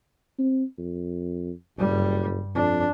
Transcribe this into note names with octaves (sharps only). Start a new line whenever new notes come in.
C4
F2
F#1 G2 G3
F2 D4